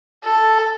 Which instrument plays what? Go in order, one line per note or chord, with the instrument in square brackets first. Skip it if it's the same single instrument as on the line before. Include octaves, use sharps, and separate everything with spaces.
[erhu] A4